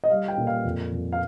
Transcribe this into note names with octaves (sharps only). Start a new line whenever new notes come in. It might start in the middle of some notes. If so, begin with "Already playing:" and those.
D#5
G3 F5
G5
A#2
F5
F2
F2
F5